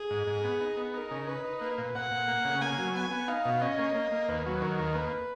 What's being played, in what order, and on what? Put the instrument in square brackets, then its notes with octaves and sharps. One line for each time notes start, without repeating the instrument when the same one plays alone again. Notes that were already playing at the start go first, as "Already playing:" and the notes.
Already playing: [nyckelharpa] G#4
[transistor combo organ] G#2
G#2
B3
D#4
B3
[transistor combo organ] D#4 [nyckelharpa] A#4
[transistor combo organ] C#3
[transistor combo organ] D#4 [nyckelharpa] B4
[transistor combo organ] D#4
[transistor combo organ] A#3 [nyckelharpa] B4
[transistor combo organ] A#2
[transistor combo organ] A#2 [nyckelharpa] F#5
[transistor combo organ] A#2
A#3
C#3
[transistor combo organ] A#3 [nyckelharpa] G#5
[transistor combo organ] F#3
[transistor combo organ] B3 [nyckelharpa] G#5
[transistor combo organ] B3
[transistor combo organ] D#4 [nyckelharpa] F5
[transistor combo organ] B2
[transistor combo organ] C#4 [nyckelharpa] D#5
[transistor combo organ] A#3
A#3
A#3
[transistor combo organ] D#2 [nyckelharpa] B4
[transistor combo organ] F#3
[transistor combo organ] D#3 [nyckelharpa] A#4
[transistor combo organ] D#2
[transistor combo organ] A#3 [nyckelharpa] B4